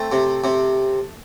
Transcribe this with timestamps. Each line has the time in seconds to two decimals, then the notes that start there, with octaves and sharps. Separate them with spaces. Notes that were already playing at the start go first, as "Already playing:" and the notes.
Already playing: A3 C4
0.12 C3
0.44 C3